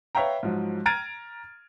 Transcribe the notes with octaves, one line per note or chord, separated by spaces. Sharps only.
B4 C#5 E5 F5 G5 A#5
G#2 F3 F#3
A#5 F6 G#6 A6 D7 D#7